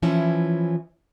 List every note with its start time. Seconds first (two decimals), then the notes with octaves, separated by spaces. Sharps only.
0.03 E3 F3 C#4 E4